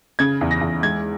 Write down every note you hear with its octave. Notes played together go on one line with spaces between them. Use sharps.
C#3 G#6
E2
A#6
E2
G#3 G#6